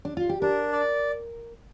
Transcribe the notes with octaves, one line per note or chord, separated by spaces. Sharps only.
D4
F4
G4
D4 A#4
D5